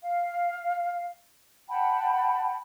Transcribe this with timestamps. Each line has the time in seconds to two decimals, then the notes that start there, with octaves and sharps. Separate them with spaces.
0.02 F5
1.69 F#5 G5 A5 B5